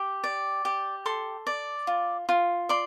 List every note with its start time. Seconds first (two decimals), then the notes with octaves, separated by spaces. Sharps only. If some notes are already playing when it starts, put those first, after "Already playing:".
Already playing: G4
0.24 D5
0.65 G4
1.06 A4 C6
1.47 D5
1.87 F4
2.29 F4
2.69 D5 C6